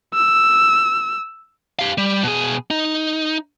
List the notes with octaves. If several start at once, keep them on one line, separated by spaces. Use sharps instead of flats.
E6
G4 F5
G3
B2 G#4
D#4